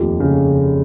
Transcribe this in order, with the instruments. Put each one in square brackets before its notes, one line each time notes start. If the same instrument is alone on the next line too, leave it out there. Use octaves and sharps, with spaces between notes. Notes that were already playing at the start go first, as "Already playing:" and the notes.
Already playing: [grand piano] F1 D#2 [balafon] F4 G4
[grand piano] C#3